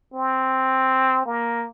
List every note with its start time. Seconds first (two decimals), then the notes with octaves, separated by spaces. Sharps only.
0.14 C4
1.26 A#3